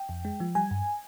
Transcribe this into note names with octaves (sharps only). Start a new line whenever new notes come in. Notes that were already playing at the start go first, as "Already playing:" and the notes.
Already playing: G5
F2
G#3
F3
G3 G#5
G2